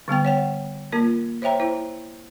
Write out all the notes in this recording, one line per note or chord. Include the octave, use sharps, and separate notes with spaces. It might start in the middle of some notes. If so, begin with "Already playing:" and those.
D3 G3 B3 G5
C#5 F#5 G5
A#3 F4 A#4
C5 C#5 E5 G5 A#5
E4 C5